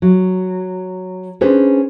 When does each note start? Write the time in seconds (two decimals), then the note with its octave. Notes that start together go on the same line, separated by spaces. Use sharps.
0.02 F#3
1.41 C#4 D4 G#4 B4 C5